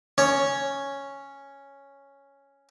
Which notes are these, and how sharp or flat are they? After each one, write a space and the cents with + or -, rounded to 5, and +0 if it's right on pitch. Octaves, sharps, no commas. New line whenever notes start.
C#4 +0 C#5 +0